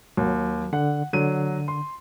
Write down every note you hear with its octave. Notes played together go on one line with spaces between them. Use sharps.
D#2 F#3
D3 F#5
D3 F#3 D#7
C6